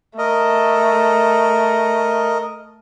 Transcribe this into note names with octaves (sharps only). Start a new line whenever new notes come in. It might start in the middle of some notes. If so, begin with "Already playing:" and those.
A3 A#4 D#5